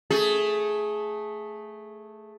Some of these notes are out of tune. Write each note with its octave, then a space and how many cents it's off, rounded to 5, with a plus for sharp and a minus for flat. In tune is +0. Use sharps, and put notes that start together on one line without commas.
A3 +0 G#4 +10